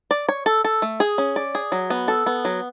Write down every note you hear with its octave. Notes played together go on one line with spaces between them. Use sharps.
D5
C#5
A4
A4
A3
G#4
C#4
D5
G#4
F#3
B3
A4
B3
F#3